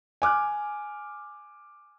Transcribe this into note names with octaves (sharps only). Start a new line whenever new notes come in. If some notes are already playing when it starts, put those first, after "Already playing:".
G#5 D6 F6 F#6